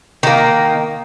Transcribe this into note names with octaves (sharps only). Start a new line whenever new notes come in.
D#3 A#3